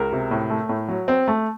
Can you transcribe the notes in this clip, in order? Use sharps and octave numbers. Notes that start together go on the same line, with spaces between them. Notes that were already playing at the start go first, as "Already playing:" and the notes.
Already playing: C#2 A#4
C3
A2
A3
A2
F#3
C4
A3